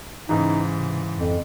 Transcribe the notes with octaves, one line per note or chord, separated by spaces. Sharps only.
G#2 C#3 E3 D#4
C3
F2